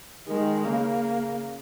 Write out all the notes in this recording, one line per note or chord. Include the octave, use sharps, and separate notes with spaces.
D#3 G#3
C#3 A#3